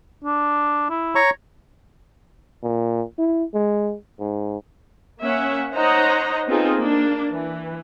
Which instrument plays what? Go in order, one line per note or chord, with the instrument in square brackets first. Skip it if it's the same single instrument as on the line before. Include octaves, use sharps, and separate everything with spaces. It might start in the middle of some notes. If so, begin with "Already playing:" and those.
[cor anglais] D4
E4
[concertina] C#5 A#5 C#6
[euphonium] A#2
E4
G#3
G#2
[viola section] A#3 C#4 E5 F#5
D#4 C5 C#5 D#5 F#5 A#5
B3 C4 D#4 F4 G#4 A4
A#3 D4
E3